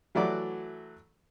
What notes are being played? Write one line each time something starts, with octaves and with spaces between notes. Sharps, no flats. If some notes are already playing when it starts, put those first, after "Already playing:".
E3 F#3 A3 F#4 D5